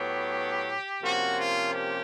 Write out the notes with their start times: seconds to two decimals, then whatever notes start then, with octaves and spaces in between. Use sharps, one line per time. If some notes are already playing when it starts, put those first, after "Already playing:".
Already playing: A2 F#3 B3 G4
1.02 C3 F3 A#3 C#4 F#4
1.37 F4
1.73 G4